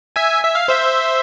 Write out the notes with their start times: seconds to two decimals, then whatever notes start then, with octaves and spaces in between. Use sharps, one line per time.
0.16 E5 G#5
0.43 E5
0.55 F5
0.68 C5 E5